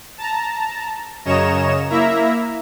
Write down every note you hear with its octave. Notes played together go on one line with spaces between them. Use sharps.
A5 A#5
F#2 C#3 C#5 D#5 A#5 E7
A#3 E4 E5 A#5